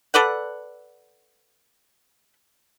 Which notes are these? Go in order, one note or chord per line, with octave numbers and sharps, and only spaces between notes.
A4 B4 D5 F#5